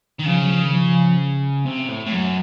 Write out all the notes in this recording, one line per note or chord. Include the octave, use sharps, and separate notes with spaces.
D#3
C#3 F3
F#3
F3
D#3
F3
C3
A2
A2
F#2 F#3